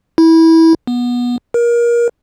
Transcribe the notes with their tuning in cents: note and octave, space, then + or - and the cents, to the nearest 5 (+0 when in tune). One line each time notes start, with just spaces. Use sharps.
E4 -20
B3 -20
A#4 +25